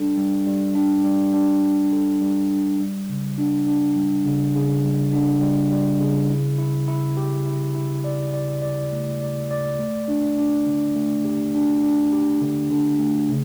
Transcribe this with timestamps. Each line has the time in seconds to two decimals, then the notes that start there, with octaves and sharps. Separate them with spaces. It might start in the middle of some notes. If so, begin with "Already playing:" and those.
Already playing: G3 D4 A4
0.17 G3
0.47 G3
0.75 D4
1.04 G3
1.34 D4
1.63 G3
1.93 A4
2.21 G3
2.51 D4
2.79 G3
3.09 C#3
3.38 D4
3.67 D4
3.96 G3
4.25 C#3
4.55 C#3
4.84 G3
5.13 D4
5.42 G3
5.72 G3
6.01 C#3
6.30 E4
6.58 E4
6.88 E4
7.17 G4
7.46 E4
7.75 E4
8.04 D5
8.34 D5
8.62 D5
8.92 A3
9.21 D5
9.51 D5
9.79 A3
10.08 D4
10.38 D4
10.66 D3
10.96 A3
11.25 G4
11.54 D4
11.84 D4
12.12 G4
12.42 D3
12.71 D3
12.99 A3
13.29 C#3